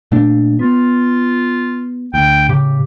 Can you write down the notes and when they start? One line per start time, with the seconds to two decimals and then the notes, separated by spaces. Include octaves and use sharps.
0.12 A#2 A3 D4
0.59 B3 F4
2.14 D2 G5
2.49 A2 C#3 G4